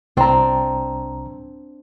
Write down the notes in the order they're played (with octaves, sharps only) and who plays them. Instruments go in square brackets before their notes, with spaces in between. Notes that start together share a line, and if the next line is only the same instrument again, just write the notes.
[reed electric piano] C2 A#5 [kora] C4 D4